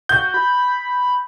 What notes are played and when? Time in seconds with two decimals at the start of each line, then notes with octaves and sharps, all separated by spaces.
0.09 F#4 G6
0.34 B5